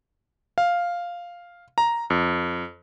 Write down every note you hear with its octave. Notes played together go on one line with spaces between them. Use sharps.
F5
A#5
F2